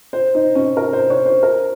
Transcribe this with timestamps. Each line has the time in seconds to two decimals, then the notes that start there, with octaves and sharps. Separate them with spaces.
0.13 C5
0.35 D#4
0.55 C#4
0.77 A#4
0.93 C5
1.10 C#5
1.26 C5
1.43 A#4